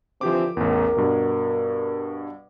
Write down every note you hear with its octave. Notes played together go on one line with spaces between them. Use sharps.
D3 E3 F3 C4 G4 D6
A1 E2 A#4
G2 B2